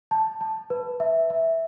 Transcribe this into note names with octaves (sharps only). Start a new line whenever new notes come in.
A5
A5
B4
E5
E5